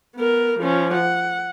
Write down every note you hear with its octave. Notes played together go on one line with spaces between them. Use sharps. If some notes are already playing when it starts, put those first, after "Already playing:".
B3 A#4
F3 C#4
F#5